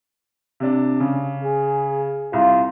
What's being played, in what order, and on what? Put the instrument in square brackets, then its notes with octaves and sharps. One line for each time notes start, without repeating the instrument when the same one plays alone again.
[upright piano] C3 D4
C#3
[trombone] G#4
[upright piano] C2 [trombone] F4